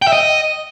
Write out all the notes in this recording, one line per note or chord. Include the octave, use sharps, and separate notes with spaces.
G5
E5
D#5